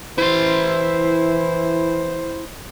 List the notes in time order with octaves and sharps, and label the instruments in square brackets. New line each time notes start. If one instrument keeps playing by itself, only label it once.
[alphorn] E3 [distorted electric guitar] E4 C6 [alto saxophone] C5